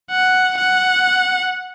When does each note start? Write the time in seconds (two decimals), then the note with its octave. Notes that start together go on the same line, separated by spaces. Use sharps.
0.11 F#5
0.58 F#5